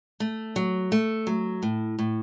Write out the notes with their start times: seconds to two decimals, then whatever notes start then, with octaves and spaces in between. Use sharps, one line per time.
0.20 A3
0.56 F#3
0.92 A3
1.27 F#3
1.63 A2
1.99 A2